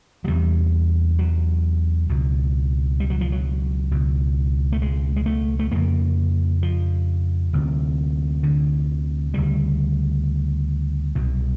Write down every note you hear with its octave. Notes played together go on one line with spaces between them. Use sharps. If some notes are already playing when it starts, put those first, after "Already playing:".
F#3
E2 C3 G3
F#3
C#2 B2
G3
F#3
F3
F#3
C#2 B2
A3
G#3
G#3
A3
A3
F2 C#3 A#3
F3
D2 C3
D3
D2 C#3 G3
C2 B2